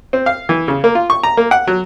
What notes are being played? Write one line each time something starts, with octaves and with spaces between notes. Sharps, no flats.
C4
F5
E3
C#3
A#3
F4
C#6
A#5
A#3
F#5
F#3